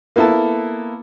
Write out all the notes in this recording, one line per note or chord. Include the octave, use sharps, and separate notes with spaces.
A#3 B3 E4 A4 A5